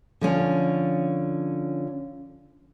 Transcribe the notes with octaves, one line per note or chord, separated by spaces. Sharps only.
D3 F3 C#4